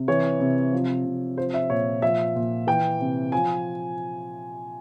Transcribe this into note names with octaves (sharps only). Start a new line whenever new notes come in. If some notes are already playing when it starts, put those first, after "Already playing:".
Already playing: C3
E3 C#5
C3
F3
C3
F3 C5
E5
A#2 C#5
F3 E5
A#2
E3 G5
C3
F3 G#5